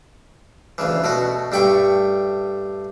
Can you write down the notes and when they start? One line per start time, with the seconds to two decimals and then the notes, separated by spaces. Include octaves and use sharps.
0.78 D2 C#3 E3
1.04 B2 A3 F#4
1.52 G2 A3 G5 B5 C#6